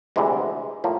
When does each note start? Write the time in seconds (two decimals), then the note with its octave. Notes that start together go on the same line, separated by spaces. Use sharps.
0.16 D2 C3 E3 G#3
0.84 A2 F3 A#3 G4